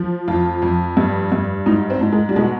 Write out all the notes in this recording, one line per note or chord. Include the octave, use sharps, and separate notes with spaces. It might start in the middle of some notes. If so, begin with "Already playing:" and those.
Already playing: F3
F2 F4
F2
G2
G2
G#2 D#4
C4
G#2
G#3
G3
B2 G#3